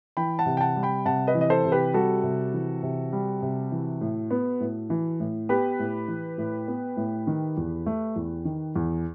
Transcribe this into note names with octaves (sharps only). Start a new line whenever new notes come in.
E3 G5 B5
F#5 A5
C3
G5
F#5 A5
G3
G5 B5
C3 F#5 A5
B4 D#5
E3
D#5
A4 C5
C3
G4 B4
G3 F#4 A4
C3
E3
C3
G3
C3
E3
A2
B3
A2
E3
A2
B3 G4 B4
A2
E3
A2
B3
A2
D#3
E2
A3
E2
D#3
E2